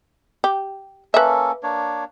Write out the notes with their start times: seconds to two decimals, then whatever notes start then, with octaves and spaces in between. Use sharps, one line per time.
0.44 G4
1.14 A#3 C#4 A4 B4 E5
1.63 A#3 D4 C#5